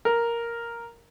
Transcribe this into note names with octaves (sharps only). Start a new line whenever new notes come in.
A#4